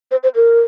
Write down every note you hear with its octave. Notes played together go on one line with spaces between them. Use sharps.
C5
C5
A#4